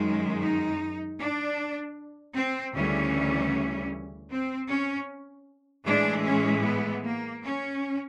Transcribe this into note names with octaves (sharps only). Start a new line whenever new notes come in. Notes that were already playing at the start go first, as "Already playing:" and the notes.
Already playing: F#2 D#3 G#3
D#4
D4
C4
D2 C#3 E3 G3 C#4
C4
C#4
A2 E3 G#3 D4
C#4
B3
A#3
C#4